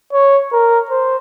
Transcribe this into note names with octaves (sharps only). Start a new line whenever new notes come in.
C#5
A#4
C5